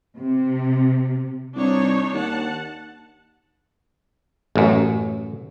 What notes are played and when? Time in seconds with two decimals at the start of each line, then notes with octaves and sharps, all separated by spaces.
0.19 C3
1.55 C2 D4 D#4 C#5
2.13 D#2 F#5 A5
4.56 A1 F#2